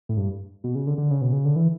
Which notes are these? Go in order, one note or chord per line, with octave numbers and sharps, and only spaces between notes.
A2
G2
B2
C#3
D3
D3
C#3
B2
C#3
D3
E3